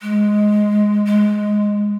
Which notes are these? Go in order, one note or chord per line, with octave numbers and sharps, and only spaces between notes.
G#3
G#3